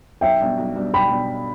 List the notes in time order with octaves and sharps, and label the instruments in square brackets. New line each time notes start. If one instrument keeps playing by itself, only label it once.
[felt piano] B1 [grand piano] E5 G5
[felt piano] B2 G3 D4
B1
B2 G3 D4
[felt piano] B1 [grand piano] G5 B5
[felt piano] B2 G3 D4